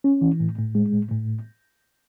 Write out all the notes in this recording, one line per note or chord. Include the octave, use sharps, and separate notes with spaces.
C#4
E3
A2
A2
G#3
A2
A2